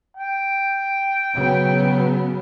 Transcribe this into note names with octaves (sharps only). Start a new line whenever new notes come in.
G5
C#3 F#3 B3